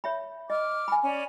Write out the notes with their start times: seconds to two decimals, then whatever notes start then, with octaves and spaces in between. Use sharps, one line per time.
0.04 C#5 E5 B5
0.50 D#5 D6 F6
0.88 G#5 B5
1.04 C#4 D5